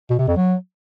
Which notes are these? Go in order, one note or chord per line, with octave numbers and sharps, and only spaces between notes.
B2
C3
F2
F#3